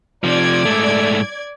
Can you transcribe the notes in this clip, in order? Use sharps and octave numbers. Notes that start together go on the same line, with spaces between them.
C3 F3 D5 G#6
G#2 A3